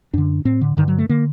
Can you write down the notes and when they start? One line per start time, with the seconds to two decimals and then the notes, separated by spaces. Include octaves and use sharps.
0.14 F#2 D3 D4
0.45 A2 C4
0.61 D3
0.77 G2 D3 D#3
0.88 F#3
0.98 A3
1.09 D3 A#3